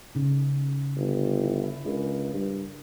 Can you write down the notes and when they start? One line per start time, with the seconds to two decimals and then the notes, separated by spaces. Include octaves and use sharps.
0.15 C#3 D#4
0.96 G1
1.44 E4
1.85 C#2 D4 G#4 A#4
2.34 G2